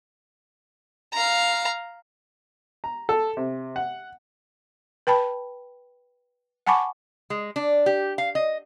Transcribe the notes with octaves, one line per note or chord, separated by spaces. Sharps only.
F5 A#5
A#5
A4
C3
F#5
B4 G5 A5 B5
F#5 G#5 A5 B5 C#6 D6
G#3
D4
G4
F5
D#5